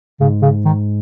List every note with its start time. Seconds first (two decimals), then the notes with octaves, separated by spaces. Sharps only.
0.20 G#2 C#3
0.42 C#3
0.65 D#3